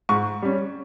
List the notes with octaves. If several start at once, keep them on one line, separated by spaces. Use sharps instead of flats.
G#2 C#6
G3 C#4